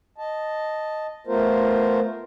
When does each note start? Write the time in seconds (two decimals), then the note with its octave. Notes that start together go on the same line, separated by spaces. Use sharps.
0.18 D#5 A5
1.27 A3 B3 F4 A#4 C5